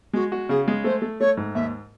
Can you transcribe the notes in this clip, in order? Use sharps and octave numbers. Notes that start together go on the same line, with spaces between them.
G#3 F#4
F#4
C#3 G#4
G#3
A3 C5
A3
A3 C#5
G#2
D#2 E5